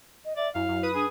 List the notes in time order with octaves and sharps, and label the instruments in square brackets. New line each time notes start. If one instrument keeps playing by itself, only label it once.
[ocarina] D#5
[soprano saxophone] D5 [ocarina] E5
[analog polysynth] F#2 [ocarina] E4 [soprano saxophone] F5
[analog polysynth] F#2
B4 D#6
[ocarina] D4 [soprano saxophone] G#4